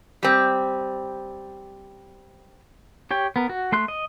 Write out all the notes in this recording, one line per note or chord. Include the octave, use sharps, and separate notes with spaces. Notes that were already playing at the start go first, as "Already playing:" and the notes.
G3 C4
G4 C#5 G5
B3 A#4
F#4
A3 C6 F#6
D#5